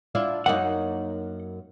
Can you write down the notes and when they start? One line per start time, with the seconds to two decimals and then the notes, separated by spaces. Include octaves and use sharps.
0.15 D4 E4 F4
0.46 F#2 A#3 D#4 F#5